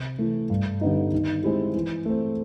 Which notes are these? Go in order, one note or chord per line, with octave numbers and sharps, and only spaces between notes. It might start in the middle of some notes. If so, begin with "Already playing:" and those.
Already playing: C3
E3 A3
G2
D3 G3 B3 D#4
D#3
G#3 C4 E4 G4
E3
A3 C4